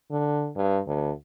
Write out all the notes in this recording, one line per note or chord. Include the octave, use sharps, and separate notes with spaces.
D3
G2
D2